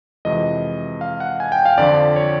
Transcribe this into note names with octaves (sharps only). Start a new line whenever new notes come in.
F2 C3 E3 G#3 D#5
F5
F#5
G#5
G5
F5
F2 D3 F3 D5
C#5